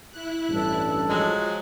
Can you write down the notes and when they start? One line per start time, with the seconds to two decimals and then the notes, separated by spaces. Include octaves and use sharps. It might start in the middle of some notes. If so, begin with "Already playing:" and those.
0.10 E4 F#6
0.49 A1 G2 A4
1.09 F3 F#3 G#3